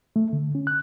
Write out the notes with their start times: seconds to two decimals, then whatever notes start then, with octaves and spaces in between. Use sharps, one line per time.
0.16 A3
0.33 D3
0.55 C#4
0.67 F#6